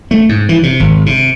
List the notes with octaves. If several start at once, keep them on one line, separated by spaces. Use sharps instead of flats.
A3
G#2
E3
C3
G#1
C3